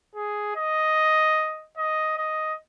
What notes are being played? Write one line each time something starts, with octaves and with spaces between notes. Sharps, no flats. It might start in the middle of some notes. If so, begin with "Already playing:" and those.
G#4
D#5
D#5
D#5